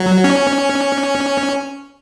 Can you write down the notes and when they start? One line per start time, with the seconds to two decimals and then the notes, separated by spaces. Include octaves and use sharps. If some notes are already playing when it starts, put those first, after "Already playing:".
Already playing: F#3
0.24 C#4